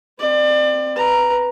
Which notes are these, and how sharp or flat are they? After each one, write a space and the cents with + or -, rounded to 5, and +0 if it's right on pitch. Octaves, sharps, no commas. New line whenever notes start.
C4 +0 D5 +30
B4 +0 A#5 +0